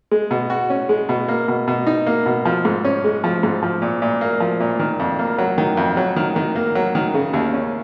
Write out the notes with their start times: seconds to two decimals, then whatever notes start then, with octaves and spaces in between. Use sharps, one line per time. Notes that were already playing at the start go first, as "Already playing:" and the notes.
0.11 G#3
0.31 B2
0.50 F#4
0.70 C#4
0.89 G#3
1.09 B2
1.28 A#3
1.48 B2
1.67 B2
1.87 D#4
2.06 A#3
2.26 B2
2.45 F3
2.65 G#2
2.85 C#4
3.04 G#3
3.24 F3
3.43 G#2
3.63 F3
3.82 A#2
4.02 A#2
4.21 A#3
4.40 F3
4.60 A#2
4.79 D#3
4.99 F2
5.19 A#3
5.38 F#3
5.58 D#3
5.77 F2
5.97 F#3
6.16 D#3
6.36 D#3
6.55 A#3
6.75 F#3
6.95 D#3
7.14 C#3
7.33 D#2
7.53 C#4